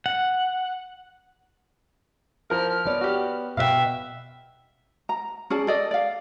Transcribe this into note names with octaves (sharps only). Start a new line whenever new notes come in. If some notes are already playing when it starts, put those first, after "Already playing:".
F#5
F3 A#4 F6
B3 C#5 D5
F#4 G4
B2 C5 E5 F5 G5 F#6
A#5
C#4 G#4 D5 A5
A4 D5 D#5
D5 F5